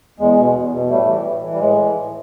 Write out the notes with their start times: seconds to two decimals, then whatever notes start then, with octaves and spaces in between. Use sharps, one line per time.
0.19 E2 G#3
0.37 B2
0.54 E2
0.72 B2
0.89 A2 G3 A3
1.07 E3
1.25 A2
1.42 E3
1.52 G3
1.59 A2 G#3
1.78 E3
1.95 A2